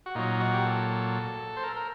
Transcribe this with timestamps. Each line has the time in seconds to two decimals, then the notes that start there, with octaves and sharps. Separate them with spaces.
0.06 F#4
0.15 A#2 F#3 D#4
0.40 F#4
0.53 G4
0.65 A4
1.57 C5
1.63 A#4
1.76 A#4